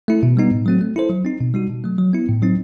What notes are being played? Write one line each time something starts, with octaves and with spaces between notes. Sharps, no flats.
A3 E4
B2
G3 B3 D#4
A2
F#3 A3 C4 F#4
A3
E4 A4 C5
F#3
C4 D#4
B2
G3 D#4 F#4
B2
F#3 A3
F#3
B3 E4
A2
F#3 C4 D#4